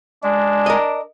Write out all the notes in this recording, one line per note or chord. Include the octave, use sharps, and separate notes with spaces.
G#3 D4 D5
A#4 D#5